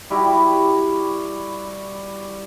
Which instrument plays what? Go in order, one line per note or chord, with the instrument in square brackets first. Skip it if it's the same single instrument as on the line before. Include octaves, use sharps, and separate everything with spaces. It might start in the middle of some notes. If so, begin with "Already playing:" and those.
[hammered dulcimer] G3 E4 F#4 G4